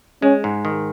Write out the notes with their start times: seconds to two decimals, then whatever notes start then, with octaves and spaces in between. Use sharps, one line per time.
0.22 G#3 C#4
0.44 G#2
0.65 D#3